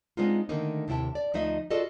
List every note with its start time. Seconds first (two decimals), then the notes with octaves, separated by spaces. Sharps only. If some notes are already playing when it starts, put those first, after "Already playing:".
0.17 G#3 B3 C4 D4 D#4 F4
0.49 D3 D#3 A3 A#3 D#4
0.88 D#2 C3 E4 G5 A5
1.15 D5
1.34 D2 F3 A3 D#4 D#5 E5
1.70 F4 F#4 G#4 A4 D5 D#5